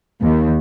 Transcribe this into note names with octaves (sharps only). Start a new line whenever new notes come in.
D#2